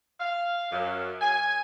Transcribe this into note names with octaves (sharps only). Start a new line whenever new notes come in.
F5
F#2
G#5